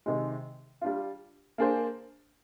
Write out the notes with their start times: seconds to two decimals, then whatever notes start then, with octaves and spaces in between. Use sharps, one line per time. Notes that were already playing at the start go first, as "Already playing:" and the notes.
0.06 C3 D#3 G#3
0.81 G3 D4 F4
1.58 A#3 D4 G#4 C5